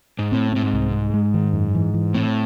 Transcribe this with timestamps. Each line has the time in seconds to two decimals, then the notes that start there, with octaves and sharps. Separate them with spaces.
0.19 G#2
0.32 A2 C4
0.52 A2 C4
0.63 G#2
0.73 C2
0.92 G#3
1.14 G#3
1.34 D#3
1.53 F#2
1.75 E3
1.94 E3
2.14 A2 C4